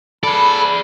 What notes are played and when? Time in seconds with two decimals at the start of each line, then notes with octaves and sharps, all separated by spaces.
0.23 G#4 A4 D5 B5